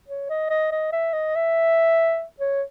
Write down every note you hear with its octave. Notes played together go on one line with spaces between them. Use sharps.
C#5
D#5
D#5
D#5
E5
D#5
E5
C#5